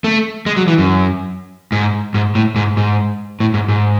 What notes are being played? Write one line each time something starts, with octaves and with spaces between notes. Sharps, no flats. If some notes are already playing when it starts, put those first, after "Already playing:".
A3
G#3
F#3
E3
F#2
G#2
G#2
A2
G#2
G#2
A2
G#2
G#2